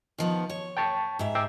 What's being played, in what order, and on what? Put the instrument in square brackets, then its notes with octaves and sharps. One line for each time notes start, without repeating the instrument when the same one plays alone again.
[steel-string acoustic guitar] D#3 F3 B3
C#5
[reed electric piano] G5 A5 C#6
[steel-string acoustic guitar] G#2 E5
[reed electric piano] G5 D6 E6